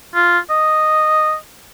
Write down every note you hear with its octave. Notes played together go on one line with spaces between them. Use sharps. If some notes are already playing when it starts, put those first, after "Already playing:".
F4
D#5